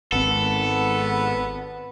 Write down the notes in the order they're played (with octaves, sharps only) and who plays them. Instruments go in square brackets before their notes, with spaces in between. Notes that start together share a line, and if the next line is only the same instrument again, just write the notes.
[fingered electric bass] G#1 C4 [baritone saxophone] B3 [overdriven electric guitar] A4